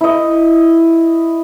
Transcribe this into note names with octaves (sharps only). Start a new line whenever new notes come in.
E4 D#5